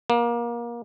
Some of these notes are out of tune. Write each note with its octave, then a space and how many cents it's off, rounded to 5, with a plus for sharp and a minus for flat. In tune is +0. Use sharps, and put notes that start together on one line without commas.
A#3 +25